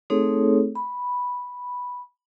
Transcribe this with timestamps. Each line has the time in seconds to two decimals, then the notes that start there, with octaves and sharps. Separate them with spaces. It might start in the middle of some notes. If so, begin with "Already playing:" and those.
0.10 A3 C4 D#4 G#4 A4 C#5
0.75 B5